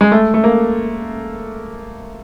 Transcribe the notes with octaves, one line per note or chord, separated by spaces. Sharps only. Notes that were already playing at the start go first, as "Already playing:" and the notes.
G#3
A3
A3
A#3